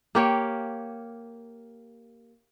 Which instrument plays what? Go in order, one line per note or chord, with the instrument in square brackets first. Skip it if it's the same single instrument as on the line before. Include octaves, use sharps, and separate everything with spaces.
[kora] A#3 G4 C#5